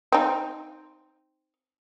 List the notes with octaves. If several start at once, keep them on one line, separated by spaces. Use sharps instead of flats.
C4 D#4